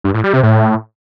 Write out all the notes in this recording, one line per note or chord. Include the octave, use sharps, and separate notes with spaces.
G2
A2
G3
C3
A2